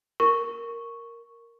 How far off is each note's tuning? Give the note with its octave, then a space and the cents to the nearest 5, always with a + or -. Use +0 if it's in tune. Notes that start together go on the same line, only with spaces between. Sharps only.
A#4 +0 C#6 +0